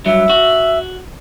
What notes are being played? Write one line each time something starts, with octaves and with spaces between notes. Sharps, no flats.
G2 F#3 E5
F#4